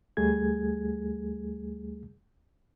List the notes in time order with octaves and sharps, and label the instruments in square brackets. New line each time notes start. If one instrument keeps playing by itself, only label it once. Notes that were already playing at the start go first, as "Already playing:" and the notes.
[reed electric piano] D2 G3 A3 G#4 G#6